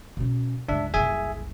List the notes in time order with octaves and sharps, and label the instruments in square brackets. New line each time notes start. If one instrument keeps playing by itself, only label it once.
[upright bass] B2 C#4
[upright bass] C#2 G2 [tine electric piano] D4 E5
[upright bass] F#1 C2 [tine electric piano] G#4 E5 G#5